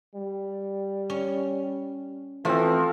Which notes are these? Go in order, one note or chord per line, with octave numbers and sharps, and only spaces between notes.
G3
C#4
E3 F3 A3 C4 F#4